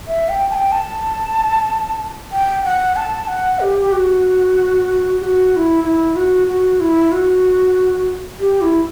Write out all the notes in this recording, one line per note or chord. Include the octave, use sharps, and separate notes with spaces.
E5
G5
A5
G5
A5
G5
F#5
A5
F#5
G4
F#4
G4
F#4
F#4
E4
E4
F#4
F#4
E4
F#4
G4
E4